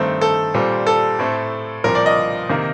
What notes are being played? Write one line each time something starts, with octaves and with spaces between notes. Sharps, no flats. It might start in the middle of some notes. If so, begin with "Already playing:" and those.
Already playing: G2 D#3 A3 C4
A4
A#2 G3 C4
A4
A2 A3 C4
C2 A#2 F3 C4 A#4
D5
D#5
C3 D#3 A#3